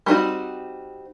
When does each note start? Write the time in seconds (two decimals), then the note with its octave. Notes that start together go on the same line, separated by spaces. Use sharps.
0.06 G3 B3 C4 D#4 F#4